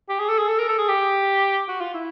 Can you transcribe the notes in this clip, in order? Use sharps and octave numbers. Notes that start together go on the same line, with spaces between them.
G4
G#4
A4
G#4
A4
A#4
A4
G#4
G4
F#4
F4
E4